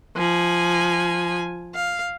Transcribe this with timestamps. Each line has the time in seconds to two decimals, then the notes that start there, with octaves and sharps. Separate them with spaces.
0.16 F3 G#5
1.75 F5